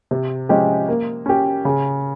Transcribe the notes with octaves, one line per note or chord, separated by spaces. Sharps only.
C3
F3 G#3 C#4 G4
A#3
C#4 G4
C#3